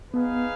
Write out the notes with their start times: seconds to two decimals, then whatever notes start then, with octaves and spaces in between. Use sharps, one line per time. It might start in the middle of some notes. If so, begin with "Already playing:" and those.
0.13 B3 D#4 G#4 B4 F5